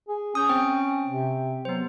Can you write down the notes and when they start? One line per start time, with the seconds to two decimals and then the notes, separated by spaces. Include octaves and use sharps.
0.08 G#4
0.35 C#4 D#6 G6
0.49 C4 C5 G5
1.06 C3
1.65 F#3 B3 C5